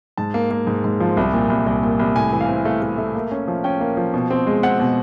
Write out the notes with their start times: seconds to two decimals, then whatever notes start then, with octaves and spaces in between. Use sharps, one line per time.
0.17 G#2 A5
0.34 A#3
0.51 A#3
0.67 G#2
0.84 G#2
1.00 F3
1.17 C2
1.34 A#2
1.50 C2
1.67 C2
1.83 A#2
1.99 C2
2.16 A2 G#5
2.33 E3
2.41 F5
2.49 C4
2.65 A3 F5
2.82 A3
2.98 A3
3.15 A#3
3.32 C#4
3.48 F3
3.64 C#4 G5
3.81 A#3
3.97 F3
4.14 B2
4.30 C4
4.47 G#3
4.63 C4 F#5
4.80 B2